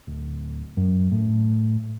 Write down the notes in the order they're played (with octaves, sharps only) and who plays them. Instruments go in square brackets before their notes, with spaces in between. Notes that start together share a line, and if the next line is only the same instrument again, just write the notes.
[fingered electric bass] D1
F#2
A2